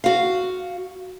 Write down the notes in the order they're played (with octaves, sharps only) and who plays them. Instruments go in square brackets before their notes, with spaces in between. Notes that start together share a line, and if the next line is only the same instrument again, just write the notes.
[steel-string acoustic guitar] F#4 F5